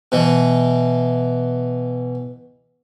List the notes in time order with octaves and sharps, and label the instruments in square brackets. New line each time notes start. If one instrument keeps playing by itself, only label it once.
[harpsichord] B2 E3